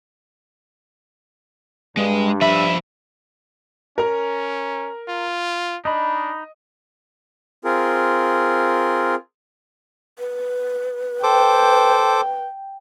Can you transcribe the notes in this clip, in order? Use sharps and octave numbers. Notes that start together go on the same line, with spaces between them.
G2 G#3
F3 E5 B5
C#4 A#4 A#5
F4
D4 D#4 D#5 B5
C4 F4 G#4 A#4
B4
A4 C5 G5 D6